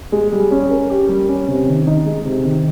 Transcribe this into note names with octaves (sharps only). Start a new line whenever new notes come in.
G#3
G3
C#4
A#4
G4
G3
C#4
C3
D#3
D#4
G#3
C3
D#3